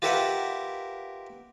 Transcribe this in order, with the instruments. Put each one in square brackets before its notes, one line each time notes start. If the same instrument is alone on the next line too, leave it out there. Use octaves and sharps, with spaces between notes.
[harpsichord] F4 G4 A#4 B4 E5 F#5